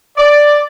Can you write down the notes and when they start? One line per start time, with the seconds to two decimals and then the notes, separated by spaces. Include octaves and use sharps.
0.17 D5